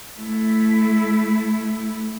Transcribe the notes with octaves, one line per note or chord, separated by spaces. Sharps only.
A3 E4